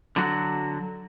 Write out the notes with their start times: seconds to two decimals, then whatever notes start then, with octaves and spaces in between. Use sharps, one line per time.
0.16 D3 F#3 F#4